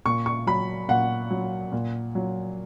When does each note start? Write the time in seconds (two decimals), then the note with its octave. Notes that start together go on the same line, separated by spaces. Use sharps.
0.05 A#2 C#6
0.26 C#6
0.47 F#3 B5
0.89 A#2 F#5
1.30 F#3
1.72 A#2
2.15 F#3